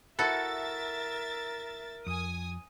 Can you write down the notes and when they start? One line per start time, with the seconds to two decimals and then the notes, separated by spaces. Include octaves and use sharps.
0.19 E4 F#4 A4 A#4 E5 A6
2.06 F2 G#5 D#6